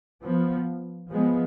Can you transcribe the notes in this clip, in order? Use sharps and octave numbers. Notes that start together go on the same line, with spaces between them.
F3 B3
F3 G#3 B3